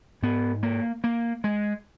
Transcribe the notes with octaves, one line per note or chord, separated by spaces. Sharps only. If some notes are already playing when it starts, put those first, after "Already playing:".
G#2 B3
A#3
A#3
G#3